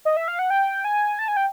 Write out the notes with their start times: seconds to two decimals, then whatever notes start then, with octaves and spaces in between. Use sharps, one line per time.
0.05 D#5
0.17 E5
0.28 F5
0.39 F#5
0.50 G5
0.84 G#5
1.19 A5
1.28 G#5
1.37 G5